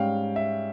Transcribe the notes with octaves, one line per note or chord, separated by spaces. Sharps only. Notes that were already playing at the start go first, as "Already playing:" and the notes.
Already playing: G#2 G3 C#4 F5 G5
E5